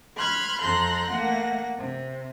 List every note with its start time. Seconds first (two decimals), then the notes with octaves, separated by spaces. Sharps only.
0.18 B5 C6 F6 F#6 G#6
0.61 F2 A4 A#5 C6 F#6 G6
1.09 A3 A#3 F#5 A#6
1.75 C3